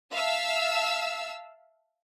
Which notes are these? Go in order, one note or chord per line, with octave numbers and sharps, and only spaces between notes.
E5 F5 A5 E6